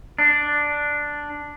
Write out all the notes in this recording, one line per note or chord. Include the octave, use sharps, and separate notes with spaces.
D4